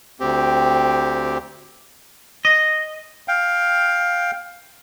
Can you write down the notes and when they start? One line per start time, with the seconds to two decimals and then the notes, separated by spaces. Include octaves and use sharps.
0.20 D2 C4 G4
2.45 D#5
3.28 F5 G5